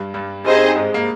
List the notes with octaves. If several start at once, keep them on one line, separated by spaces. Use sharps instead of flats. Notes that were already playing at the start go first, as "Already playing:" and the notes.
Already playing: G2 G3
G2 G3
G2 G3 C4 D#4 G#4 C5 D#5
G#2 G#3
A#3